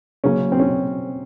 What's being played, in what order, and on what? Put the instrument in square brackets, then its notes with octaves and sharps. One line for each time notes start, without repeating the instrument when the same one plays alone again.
[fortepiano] C#3 F#3 A#3 C#4
C4
C#4